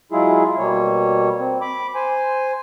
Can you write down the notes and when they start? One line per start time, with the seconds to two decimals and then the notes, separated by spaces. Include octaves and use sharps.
0.12 F#3 G#3 E4 F4 G#4
0.58 B2 G3 A#3 C#5
1.38 C4
1.61 B5 D6
1.95 C5 G#5